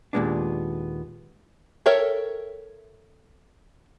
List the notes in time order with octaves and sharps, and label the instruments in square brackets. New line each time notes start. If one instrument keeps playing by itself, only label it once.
[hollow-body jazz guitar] D#2 A#2 F#3 G#3 B3 D4
[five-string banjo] A4 A#4 C#5 E5 G5